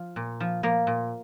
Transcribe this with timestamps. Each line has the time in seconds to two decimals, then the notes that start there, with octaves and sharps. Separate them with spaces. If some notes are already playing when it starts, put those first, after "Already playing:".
Already playing: F3
0.16 A#2
0.40 F3
0.63 F3 A#3
0.87 A#2